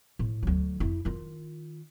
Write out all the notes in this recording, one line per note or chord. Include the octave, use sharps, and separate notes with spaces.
A2
D2 F#3
F2 E4
D#3 F4